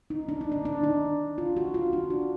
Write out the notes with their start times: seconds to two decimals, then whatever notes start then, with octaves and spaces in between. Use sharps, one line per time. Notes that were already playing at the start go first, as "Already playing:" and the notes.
0.10 D#4
0.29 D4
0.41 D#4
0.52 D4
0.65 D4
0.84 D#4
1.38 F4
1.57 F#4
1.74 F4
1.93 D4
2.10 F#4